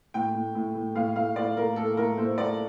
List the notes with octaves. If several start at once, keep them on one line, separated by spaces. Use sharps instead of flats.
A2 G5
A2
A2
A2
A2 F5
A2 F5
A2 D5
A2 A#4
A2 A4
A2 A#4
A2 C5
A2 D5